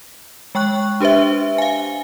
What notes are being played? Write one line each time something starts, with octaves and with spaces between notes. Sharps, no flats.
G#3 G5 C#6 F#6
D4 G4 B4 C5 E5
F5 G#5